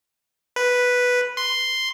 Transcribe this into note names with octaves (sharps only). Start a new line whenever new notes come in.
B4
C6